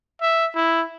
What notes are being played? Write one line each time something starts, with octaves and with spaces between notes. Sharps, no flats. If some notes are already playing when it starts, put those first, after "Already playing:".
E5
E4